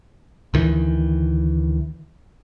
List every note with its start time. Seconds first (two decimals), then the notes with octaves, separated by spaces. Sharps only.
0.54 D2 D#3 E3